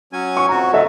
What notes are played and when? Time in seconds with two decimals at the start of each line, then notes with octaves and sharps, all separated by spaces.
0.13 F#3 C#4 G#5
0.37 C#6
0.49 F2 F#4 A#5
0.73 A2 D3 F#3 A4 D#5 E5